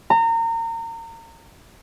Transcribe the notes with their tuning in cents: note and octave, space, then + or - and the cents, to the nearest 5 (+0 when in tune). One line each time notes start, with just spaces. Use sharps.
A#5 -30